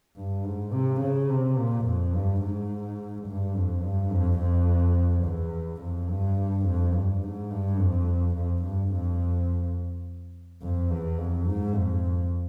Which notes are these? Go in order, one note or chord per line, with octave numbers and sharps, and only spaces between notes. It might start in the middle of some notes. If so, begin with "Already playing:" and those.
G2
G#2
C3
C#3
C3
A#2
F2
G2
G#2
G2
F2
G2
F2
F2
E2
F2
G2
F2
G2
G#2
G2
F2
F2
G2
F2
F2
E2
F2
G#2
F2